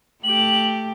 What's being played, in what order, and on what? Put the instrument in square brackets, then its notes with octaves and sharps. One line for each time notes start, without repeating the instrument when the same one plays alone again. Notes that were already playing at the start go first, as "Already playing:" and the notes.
[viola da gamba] A3 G4 [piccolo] F#7